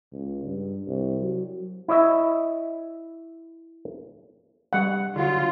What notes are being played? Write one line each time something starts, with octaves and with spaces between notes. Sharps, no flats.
C#2
G2
C2
F#3
E4 C#5 D#5 E5
G3 F#5
D3 F#3 F4